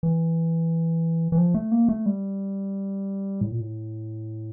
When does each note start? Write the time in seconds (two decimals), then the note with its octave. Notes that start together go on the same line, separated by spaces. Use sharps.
0.03 E3
1.32 E3
1.38 F3
1.54 A3
1.72 A#3
1.89 A3
2.06 G3
3.41 A2
3.51 A#2
3.60 A2